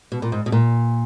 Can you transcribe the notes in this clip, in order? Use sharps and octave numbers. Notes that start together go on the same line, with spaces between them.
B2
A#2
G#2
B2
A#2